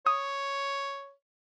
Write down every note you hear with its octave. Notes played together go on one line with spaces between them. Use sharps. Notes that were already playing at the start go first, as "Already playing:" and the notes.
C#5 D#6